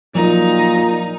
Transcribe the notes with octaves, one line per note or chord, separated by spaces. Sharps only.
A#2 F3 F#3 D#4